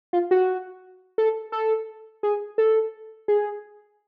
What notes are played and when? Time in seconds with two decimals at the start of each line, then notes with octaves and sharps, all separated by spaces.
0.13 F4
0.31 F#4
1.18 A4
1.52 A4
2.23 G#4
2.58 A4
3.28 G#4